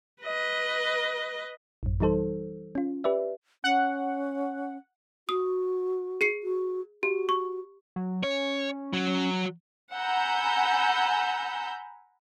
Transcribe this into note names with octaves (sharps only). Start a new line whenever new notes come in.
B4 D#5
A1 F#2
E3 G3 D#4 A4 C5
C#4 F4
G4 B4 D5 E5
C#4 F#5
F#4 D#6
G#4 C7 C#7
F#4
F#4 G4
C#6
F#3
C#4 C#5
F#3 F#4
F#5 G#5 A#5 B5 E6 G6